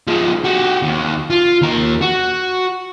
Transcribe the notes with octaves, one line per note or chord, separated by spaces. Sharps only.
F3 G#3
F#4 G4
D#2
F4
D#2 A#4
F#4